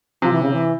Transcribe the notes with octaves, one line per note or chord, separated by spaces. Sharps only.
C3 F3
E3
C#3
E3